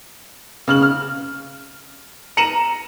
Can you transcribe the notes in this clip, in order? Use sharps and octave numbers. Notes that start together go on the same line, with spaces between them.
C#3 F6 F#7
F6
A#5 C#7 D#7 E7 F#7